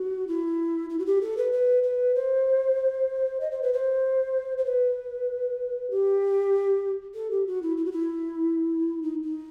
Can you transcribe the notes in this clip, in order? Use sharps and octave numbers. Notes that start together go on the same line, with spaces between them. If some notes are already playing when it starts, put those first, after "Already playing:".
Already playing: F#4
E4
E4
F#4
G4
A4
B4
B4
B4
C5
D#5
C5
B4
C5
C5
B4
G4
A4
G4
F#4
E4
E4
F#4
E4
D#4
D#4